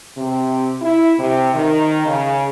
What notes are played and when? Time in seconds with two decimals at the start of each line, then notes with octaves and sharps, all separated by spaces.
0.16 C3
0.81 E4
1.18 C3
1.54 D#3
2.05 C#3